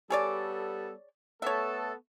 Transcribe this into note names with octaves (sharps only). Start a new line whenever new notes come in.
G3 B3 G#4 A4 C#5 D5
A3 B3 A4 C#5 E5